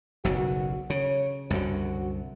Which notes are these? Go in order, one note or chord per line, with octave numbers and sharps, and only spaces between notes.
F#1 B1 C#3 F#4
C#3 C#5
C2 F#2 D3 F#4